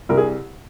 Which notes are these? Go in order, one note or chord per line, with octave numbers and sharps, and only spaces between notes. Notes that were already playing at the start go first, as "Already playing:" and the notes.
C2 A#4
G#4